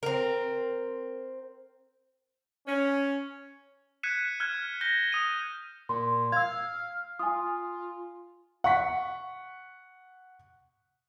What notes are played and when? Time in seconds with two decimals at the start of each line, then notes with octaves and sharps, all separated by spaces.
0.03 C4 A#4
2.66 C#4
4.03 F#6 G#6 B6 C#7 D#7 E7
4.40 F6 F#6 G#6
4.81 G6 A#6 G7
5.12 D#6 D#7
5.89 A#2 C6
6.32 F5 E6 G#6
7.19 F4 G#5 D#6
8.64 F#5 C#6 B6